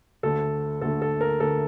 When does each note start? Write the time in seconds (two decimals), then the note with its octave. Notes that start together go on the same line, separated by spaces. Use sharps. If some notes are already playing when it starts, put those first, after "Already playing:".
0.23 D2 D3 A3 A4
0.81 D2 D3 A3 A4
1.02 A4
1.21 A#4
1.40 D2 D3 A3 A4